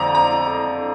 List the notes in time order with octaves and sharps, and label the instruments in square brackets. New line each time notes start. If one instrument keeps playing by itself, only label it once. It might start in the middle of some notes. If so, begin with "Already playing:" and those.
Already playing: [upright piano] F2 D3 C4 D5 A#5
A#5